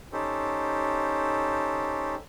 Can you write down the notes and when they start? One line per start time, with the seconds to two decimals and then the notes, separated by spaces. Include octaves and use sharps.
0.12 C#4 D#4 G4 A4 C5